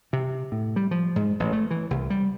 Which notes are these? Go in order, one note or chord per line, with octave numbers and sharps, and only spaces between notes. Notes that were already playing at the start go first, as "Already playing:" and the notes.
C3
A2
G3
F3
G#2
A1
A3
E3
C2
G3